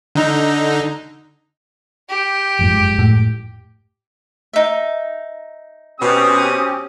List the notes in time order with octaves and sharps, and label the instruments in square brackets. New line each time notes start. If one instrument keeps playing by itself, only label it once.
[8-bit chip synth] D3 D#4
[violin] G4 G5
[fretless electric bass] F#1 F2 G#2
[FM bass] A2
[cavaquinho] D#4 E5
[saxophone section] B2 [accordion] C4 C#4 G4 [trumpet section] D#6